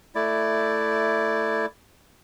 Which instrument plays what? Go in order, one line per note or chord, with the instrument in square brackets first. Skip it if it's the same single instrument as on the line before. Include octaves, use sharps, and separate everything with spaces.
[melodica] A3 E4 D5